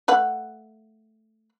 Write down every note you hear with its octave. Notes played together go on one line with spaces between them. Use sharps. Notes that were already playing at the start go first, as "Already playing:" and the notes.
A3 B4 F#5